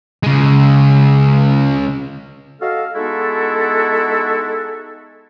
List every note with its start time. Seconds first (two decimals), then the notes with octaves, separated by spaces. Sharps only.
0.23 C#3 G#3
2.62 F#4 A4 D#5 F5
2.96 G#3 B3 D#4 E4 F#4 A4